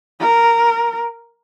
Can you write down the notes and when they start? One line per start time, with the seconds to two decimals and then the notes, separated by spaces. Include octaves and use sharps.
0.20 A#4